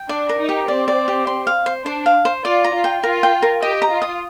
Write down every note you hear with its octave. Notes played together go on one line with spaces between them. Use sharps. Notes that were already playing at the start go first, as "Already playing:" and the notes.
Already playing: G5
D4 D5
A#4
D#4
G4
C4 D5
D5
G4
C6
F5
C5
D4 C5
F5
C5
F4 D5
A#5
F4
G5
F4 A#4
G5
A#4
G4 D#5
A#5
F4
D#6